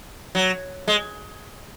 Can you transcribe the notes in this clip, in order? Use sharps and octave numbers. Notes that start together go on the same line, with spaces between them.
F#3
G#3